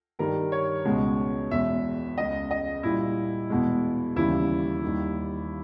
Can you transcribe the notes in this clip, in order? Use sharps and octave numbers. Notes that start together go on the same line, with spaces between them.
G2 D#3 G3 A#4
C#5
C#2 B2 G#3
E2 B2 G#3 E5
C#2 C#3 G#3 D#5
D#5
A#2 G3 E4
E2 B2 G#3
D#2 C#3 E3 G3 E4
D#2 D#3 G3